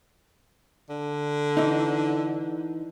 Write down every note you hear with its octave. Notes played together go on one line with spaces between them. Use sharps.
D3
E3 D#4